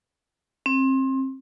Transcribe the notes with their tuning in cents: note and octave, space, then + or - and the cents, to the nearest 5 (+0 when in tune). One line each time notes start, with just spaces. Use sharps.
C4 +25